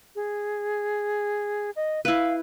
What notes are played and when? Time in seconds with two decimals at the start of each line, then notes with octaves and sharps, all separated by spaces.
0.15 G#4
1.76 D#5
2.05 E4 B4 F5